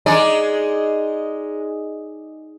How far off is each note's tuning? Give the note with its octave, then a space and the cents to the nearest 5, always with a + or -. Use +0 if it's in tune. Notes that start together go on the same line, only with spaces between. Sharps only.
G#3 +0 D#4 +0 D5 +0